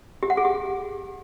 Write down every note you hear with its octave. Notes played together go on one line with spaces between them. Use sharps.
G4
F#5
G#4
G4